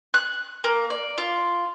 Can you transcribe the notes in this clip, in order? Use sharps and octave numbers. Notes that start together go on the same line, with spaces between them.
F#6
A#3
D5
F4